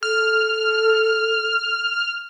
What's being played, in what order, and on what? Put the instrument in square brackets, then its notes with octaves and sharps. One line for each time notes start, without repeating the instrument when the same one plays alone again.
[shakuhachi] A4 [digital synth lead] F6